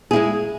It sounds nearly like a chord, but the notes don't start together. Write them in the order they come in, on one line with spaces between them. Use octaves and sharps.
G#4 E4 G#3